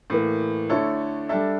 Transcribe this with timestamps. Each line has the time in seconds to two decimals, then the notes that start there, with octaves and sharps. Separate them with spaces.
0.10 A2 E3 A#3
0.69 D3 A3 E4 A4 C#5
1.29 G3 D4 A4 E5